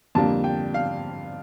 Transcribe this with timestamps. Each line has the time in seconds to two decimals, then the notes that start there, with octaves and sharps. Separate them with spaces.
0.15 F2 D3 G3 A#3 A5
0.44 G5
0.74 F5